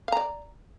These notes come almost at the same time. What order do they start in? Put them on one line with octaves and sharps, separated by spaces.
F5 A#5 D5